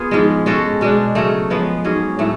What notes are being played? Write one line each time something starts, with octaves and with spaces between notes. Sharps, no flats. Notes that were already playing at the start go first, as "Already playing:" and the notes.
Already playing: B3 F4 G#4
G#2 F3 G#3
G#3 C#4 F#4 A4
B2 G#3 D4
C#3 F#3 A3
F3 G#3 B3
G#2 F#3 C#4 G#4
A2 F#3 A3